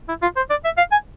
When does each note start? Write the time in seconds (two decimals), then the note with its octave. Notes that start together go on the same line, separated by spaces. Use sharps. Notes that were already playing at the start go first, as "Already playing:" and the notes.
0.09 E4
0.22 F4
0.37 C5
0.50 D5
0.64 E5
0.78 F5
0.92 G#5